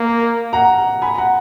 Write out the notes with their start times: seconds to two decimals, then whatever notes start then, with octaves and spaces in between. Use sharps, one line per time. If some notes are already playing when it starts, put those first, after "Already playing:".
Already playing: A#3
0.53 F#5 A#5
1.02 G#5 B5
1.18 F#5 A#5